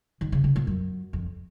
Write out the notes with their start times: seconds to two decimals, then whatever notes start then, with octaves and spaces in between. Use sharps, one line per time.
0.21 D#3
0.32 C#3
0.44 C#3
0.56 A#2
0.67 F#2
1.13 F2